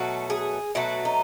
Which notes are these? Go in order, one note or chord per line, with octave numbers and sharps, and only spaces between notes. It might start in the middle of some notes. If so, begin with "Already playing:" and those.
Already playing: B2 F#3 A3 F#4
G#4
B2 F#3 A3 F#4
D#4